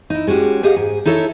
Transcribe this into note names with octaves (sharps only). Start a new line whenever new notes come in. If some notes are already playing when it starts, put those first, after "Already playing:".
D#4 E4
G#3 C#4 F#4 G4
G4 G#4 C5 D#5 F5 F#5
G#2 G#5
D#4 E4 A4 C#5 D#5 E5